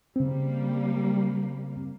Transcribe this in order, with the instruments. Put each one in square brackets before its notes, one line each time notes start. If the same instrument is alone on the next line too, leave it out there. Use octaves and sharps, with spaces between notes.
[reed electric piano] C#3 C4 [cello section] G3 A#3